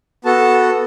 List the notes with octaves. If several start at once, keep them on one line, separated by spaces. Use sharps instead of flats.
B3 F#4 A4 A5